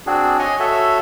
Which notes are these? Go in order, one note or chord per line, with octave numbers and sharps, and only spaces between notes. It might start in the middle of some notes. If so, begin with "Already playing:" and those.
C4 D4 F#4 G#4
C#5 D#5 F#5 G#5
F#4 A4 C#5 E5